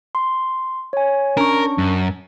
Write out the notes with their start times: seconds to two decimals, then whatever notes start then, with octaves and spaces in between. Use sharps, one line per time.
0.15 C6
0.93 C#5 G#5
1.37 C#4 D4 A#4 C#6
1.78 F#2